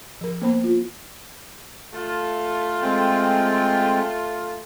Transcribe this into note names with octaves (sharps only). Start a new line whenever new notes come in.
F3 A#4
A#3 B3 C5 B5
F4
A3 F4
G#3 C4 G5